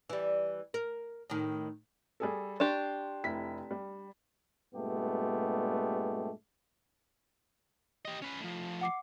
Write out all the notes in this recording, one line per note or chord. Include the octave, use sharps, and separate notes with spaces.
E3 G3
A#4
A2 D#3
G3 G#4 A4
D4 G4 C6 C#6
F1 E4 B6
G3
G2 A#2 G#3 A3 B3 G4
G4 D#5
C#4 B4
A2 F3
F#5 D6 C7